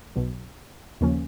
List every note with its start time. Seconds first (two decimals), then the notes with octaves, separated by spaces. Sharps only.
0.15 B1 B2 F#3
1.01 D#2 C#3 F3 A#3 C#4